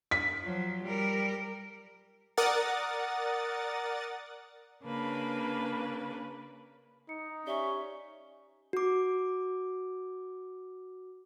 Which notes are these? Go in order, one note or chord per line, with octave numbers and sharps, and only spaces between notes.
B6
F3 F#3
G3 A#4
A#4 D5 F#5 D#6 A6
C#3 A#3 D4 B4
D#4 C#7
C#4 G4 D5 E5 G7
F#4 D6